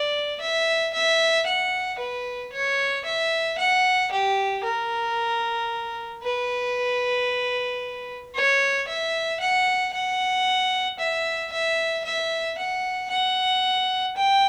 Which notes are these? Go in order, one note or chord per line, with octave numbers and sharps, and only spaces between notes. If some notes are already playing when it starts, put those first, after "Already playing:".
Already playing: D5
E5
E5
F#5
B4
C#5
E5
F#5
G4
A#4
B4
C#5
E5
F#5
F#5
E5
E5
E5
F#5
F#5
G5